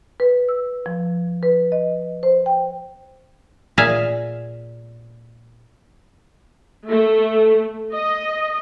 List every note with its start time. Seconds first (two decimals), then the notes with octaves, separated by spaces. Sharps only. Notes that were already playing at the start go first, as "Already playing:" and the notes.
0.20 B4
0.49 E6
0.86 F3
1.43 B4
1.72 D#5
2.23 C5
2.46 G5
3.77 A#2 G#4 E5 F5 A#5
6.88 A3
7.94 D#5